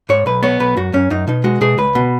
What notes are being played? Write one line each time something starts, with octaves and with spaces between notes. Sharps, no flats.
G#2 C#5
B1 B4
B3 C#5
B1 B4
F#2 F#4
F#2 C#4
F#2 D#4
B2 D#4
G#3 F#4
B2 G#4
C#2 B4
B2